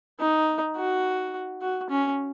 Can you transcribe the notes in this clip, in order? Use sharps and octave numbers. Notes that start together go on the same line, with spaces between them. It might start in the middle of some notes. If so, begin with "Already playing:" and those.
D#4
F#4
F#4
C#4